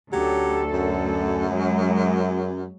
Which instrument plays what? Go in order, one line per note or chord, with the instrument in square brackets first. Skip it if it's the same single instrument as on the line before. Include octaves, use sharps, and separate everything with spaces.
[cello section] D2 A4 [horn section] F#3 C#4 G4
[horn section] F#2
[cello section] F#3 G#3